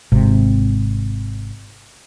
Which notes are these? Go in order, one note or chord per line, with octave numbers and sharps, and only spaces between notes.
G#1 C3